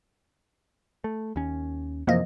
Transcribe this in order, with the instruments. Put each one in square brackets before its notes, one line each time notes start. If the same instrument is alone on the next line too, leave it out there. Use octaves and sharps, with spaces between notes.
[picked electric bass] A3
D#2 C#4
[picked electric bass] F#2 C3 E3 [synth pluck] F3 A#3 D#5